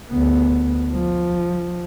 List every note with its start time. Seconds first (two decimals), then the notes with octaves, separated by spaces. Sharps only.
0.11 D2 B3
0.92 F3